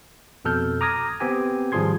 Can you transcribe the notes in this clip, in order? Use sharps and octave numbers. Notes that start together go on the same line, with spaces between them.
F2 B2 A4 F6 G6
A#5 D6 D#6 F6 G#6 A#6
B3 C4 G4 G#5
G#1 F3 G3 G#4 C6 G#6